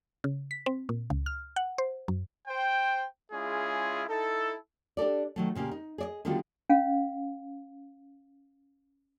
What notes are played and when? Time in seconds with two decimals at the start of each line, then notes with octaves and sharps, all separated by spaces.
0.24 C#3
0.51 B6
0.66 C4
0.89 A#2
1.10 C#2
1.26 F6
1.56 F#5
1.78 C5
2.08 F#2
2.48 C5 G5
3.32 G#3 C#4 E4 F4 G#4
4.09 D#4 E4 A4
4.97 D4 G4 A4 D5
5.36 D#3 F#3 A3
5.55 A#2 C#3 A#3 G4
5.71 D#4
5.98 G#4 D5 D#5
6.25 D3 D#3 G3 B3 F4 F#4
6.70 C#4 F5